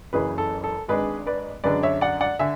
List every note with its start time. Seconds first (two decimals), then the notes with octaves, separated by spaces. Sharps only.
0.13 F#1 F#2 C#3 E3 G#4 B4
0.38 A4
0.64 A4
0.88 G#1 G#2 G#3 D4 G#4 B4
1.27 B4 D5
1.64 F#2 D3 G#3 D4 B4 D5
1.83 C#5 E5
2.01 D5 F#5
2.21 D5 F#5
2.39 D3 E5 G#5